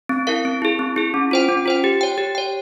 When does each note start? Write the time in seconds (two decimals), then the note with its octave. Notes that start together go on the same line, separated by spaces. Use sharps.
0.09 C4
0.27 E4 A#4 F5
0.45 C4
0.62 E4 G#4
0.79 C4
0.96 E4 G#4
1.14 C#4
1.31 F4 C5 G5
1.49 C#4
1.66 F4 C5 G5
1.84 G4
2.01 C#5 G5
2.18 G4
2.35 C#5 G5